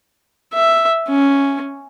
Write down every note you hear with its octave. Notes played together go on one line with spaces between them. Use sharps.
E5
C#4